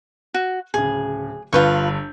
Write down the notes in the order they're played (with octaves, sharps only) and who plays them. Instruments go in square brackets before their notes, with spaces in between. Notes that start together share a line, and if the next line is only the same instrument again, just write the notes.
[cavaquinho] F#4
[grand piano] D1 C#3 [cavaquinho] G#4
[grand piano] G1 G2 G6 [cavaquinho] F4 B4 C#6